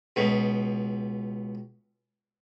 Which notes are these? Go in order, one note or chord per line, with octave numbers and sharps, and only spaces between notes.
C#2 B2